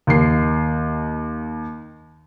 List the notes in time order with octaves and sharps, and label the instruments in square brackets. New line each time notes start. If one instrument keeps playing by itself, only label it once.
[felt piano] D#2 C7